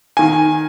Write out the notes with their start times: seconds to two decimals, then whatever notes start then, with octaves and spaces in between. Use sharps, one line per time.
0.17 D#3 G#5